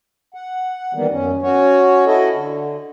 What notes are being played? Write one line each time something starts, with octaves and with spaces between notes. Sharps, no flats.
F#5
D#3 E3 G3 A#3 B3
F#2 C#4
C#4 F#4 C#5
E4 F#4 A4 D#5
D3